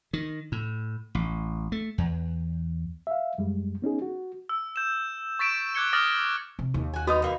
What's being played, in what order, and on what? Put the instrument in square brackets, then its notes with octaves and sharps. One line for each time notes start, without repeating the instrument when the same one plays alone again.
[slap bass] D#3
A2
A1
A3
E2
[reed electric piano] E5 F5
F#2 G3 G#3
B3 C#4 D#4 G#4
F#4
[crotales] E6
G6 E7
C#6 A6 B6 D7 E7
D6 F#6 G#6 C#7 G7
D6 D#6 F6 A6 A#6 G7
[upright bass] C3
D#2
[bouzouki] F#4 G#5
[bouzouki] B3 D#4 A#5 [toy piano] F#4 D#6
[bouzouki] E3 A#3 D#4